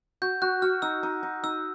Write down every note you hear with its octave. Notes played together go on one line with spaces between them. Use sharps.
F#4 G6
F#4 F#6
F#4 F6
D#4 E6
D#4
D#4
D#4 E6